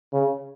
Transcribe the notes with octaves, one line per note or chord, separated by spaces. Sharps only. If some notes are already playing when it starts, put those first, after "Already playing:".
C#3